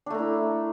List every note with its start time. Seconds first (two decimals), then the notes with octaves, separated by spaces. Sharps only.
0.06 D4
0.10 A3
0.14 A#4
0.19 E4